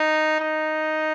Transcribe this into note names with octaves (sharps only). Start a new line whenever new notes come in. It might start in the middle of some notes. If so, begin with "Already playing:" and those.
Already playing: D#4
D#4